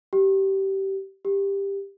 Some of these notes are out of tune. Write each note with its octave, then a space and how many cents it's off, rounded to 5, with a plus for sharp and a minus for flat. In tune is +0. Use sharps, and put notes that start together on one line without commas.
G4 -20
G4 +15